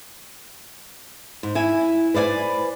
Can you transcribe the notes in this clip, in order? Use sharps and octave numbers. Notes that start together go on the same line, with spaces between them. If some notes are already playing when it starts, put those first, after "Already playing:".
G#2
E4 G#5
B4 C5 D5 F#5 G#5